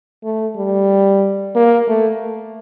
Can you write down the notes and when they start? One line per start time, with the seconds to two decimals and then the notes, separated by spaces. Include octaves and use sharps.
0.24 A3
0.56 G3
1.55 A#3
1.88 A3